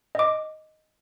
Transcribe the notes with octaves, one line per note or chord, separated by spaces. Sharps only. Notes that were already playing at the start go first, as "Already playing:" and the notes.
D#5 D6